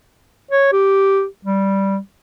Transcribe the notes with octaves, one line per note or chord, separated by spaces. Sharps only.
C#5
G4
G3